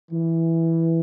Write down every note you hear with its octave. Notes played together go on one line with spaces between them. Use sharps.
E3